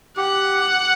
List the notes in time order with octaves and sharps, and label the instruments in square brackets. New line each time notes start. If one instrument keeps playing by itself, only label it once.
[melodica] G4 [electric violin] F#5